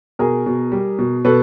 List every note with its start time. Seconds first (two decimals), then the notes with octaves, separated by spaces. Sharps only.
0.19 B2 G#4 A#4
0.46 B2
0.72 G3
0.99 B2
1.25 B2 A4 B4